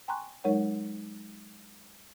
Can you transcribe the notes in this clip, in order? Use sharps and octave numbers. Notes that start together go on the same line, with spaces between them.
G5 G#5 A#5 C6 C#6 F#6
F#3 G#3 D#4 A#4 C#5 F#5